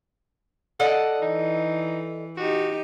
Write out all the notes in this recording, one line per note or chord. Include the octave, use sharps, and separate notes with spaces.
A4 D5 D#5 F#5
E3 D#4
D#4 F#4 G4